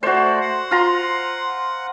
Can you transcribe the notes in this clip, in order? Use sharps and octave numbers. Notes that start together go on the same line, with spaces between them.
A3 F#4 C5 D5
F#5
F4 A#5 C6